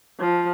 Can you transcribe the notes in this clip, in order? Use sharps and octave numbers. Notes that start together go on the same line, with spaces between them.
F3